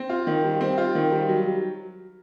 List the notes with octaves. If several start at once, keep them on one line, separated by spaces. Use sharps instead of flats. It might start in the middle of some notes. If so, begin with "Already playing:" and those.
Already playing: C4
F4
D#3
G3
C4
F4
D#3
G3
F#3